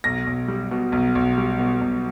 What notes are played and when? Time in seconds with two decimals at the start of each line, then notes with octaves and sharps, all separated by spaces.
0.04 B1 A#6
0.27 B1
0.48 G3
0.71 B2
0.92 B1
1.15 B1
1.38 G3
1.59 B2
1.81 B1